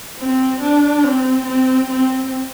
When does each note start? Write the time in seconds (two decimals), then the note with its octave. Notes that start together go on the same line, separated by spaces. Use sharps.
0.18 C4
0.62 D4
1.04 C4
1.47 C4
1.91 C4